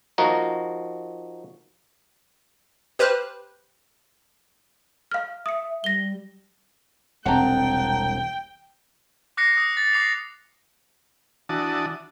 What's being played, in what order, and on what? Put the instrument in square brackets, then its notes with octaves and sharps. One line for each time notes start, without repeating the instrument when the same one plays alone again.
[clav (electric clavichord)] F3 D#4 F#4 A#4
[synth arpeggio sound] G4 B4 C5 F6 F#6
[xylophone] F5 F6
[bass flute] E5 [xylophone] D#6 C#7
[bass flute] G3 [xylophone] A#6 G7
[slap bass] E1 C2 C4 [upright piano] F#5 A5 A#5 [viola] G5
[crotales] D6 F#6 A#6 C7 C#7
D#6
A6
D6 C7 F7
[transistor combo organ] E3 D4 F#4 A5 D#6